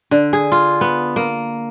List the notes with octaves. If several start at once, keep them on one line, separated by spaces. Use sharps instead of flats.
D3
G#4
F4
B3
A#3